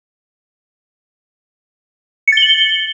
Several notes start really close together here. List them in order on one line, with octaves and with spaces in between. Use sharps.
C#7 A6 G7 F#7